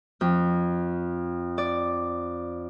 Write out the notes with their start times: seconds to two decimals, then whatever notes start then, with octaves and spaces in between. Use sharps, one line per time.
0.21 F2
1.58 D5